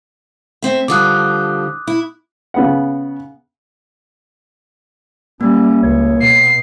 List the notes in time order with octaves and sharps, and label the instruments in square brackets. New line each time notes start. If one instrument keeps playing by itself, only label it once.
[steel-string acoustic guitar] A3 C4 E5
[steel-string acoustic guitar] D3 F3 G3 [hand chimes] D6 D#6 F#6
[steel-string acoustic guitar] E4
[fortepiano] C#3 B3 F#5
[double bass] G3 [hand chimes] A#3 [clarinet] C#4
[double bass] C#2 [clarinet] C#5
[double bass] B2 [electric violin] C7